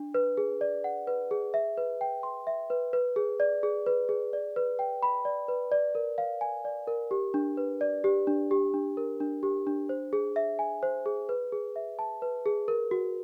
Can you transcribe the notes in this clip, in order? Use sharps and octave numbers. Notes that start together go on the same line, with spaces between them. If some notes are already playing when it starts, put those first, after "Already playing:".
Already playing: D4
B4
G#4
D5
F#5
B4
G#4
E5
B4
G5
C6
E5
B4
B4
G#4
D5
G#4
B4
G#4
D5
B4
G5
B5
D5
B4
D5
A#4
F5
G#5
D5
A#4
G4
D4
B4
D5
G4
D4
G4
D4
A#4
D4
G4
D4
C5
G#4
E5
G#5
C5
G#4
B4
G#4
E5
A5
B4
G#4
A#4
F#4